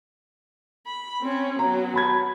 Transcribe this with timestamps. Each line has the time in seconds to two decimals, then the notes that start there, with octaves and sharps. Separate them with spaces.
0.86 B5
1.21 C4 C#4
1.59 F#3 B3 A#5
1.94 A5 B5 G#6